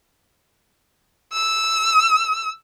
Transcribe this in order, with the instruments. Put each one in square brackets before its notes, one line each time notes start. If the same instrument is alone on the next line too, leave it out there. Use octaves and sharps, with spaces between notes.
[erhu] E6